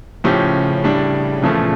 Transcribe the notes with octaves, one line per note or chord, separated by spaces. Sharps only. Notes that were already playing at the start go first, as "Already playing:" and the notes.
A2 C#3 F3 C#4 G4
A2 G3 D4
E2 A#2 C#3 F3 A3